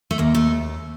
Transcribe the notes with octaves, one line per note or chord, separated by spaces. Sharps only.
A3
D#2 A#3
A3